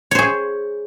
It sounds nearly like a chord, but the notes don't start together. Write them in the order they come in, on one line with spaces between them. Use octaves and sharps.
C#5 C5 G#4